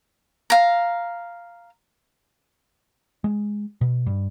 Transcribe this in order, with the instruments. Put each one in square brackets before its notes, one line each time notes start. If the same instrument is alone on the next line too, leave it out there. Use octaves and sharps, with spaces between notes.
[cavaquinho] F5 A#5
[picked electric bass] G#3
B2
G2